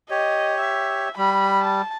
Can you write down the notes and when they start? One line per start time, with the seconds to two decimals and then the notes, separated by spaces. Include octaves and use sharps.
0.10 G4 C#5 D#5
0.60 E5
1.17 G3 B5
1.62 A5